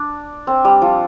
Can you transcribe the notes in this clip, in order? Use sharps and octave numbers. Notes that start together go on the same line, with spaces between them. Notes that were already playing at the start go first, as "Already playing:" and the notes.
Already playing: D4
C4
G3
F3